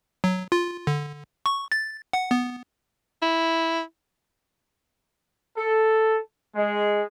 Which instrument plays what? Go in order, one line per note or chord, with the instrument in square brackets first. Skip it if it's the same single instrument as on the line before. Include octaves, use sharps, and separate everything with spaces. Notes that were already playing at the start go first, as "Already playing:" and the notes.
[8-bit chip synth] F#3
F4
D3
C#6
A6
F#5
B3
[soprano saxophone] E4
[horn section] A4
G#3